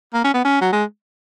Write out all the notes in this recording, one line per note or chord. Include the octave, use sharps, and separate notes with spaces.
A#3
C#4
B3
C#4
F#3
G#3